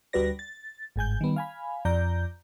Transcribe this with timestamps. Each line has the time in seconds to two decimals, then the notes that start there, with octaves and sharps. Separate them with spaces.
0.13 D2 G3 F#4 B4 D5 A#6
0.39 A6
0.96 G1 G#2 G#5 G6
1.21 D#3 G3 B3
1.36 F5 G#5 B5
1.85 F2 D5 A#5 G6